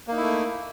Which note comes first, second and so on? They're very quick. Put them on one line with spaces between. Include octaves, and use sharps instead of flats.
A#3 D#4 E4 A3